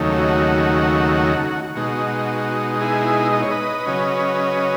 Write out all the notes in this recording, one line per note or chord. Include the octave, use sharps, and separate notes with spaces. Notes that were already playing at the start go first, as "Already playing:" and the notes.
Already playing: D#2 C#3 F#3 A3 D#4
F#4
B2 G#3 D#4 F#4
E4 G#4
D#5
C#5
B4 D#5
C#3 F#3 C#4